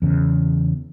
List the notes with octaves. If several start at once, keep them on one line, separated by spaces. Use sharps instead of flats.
E2 C#3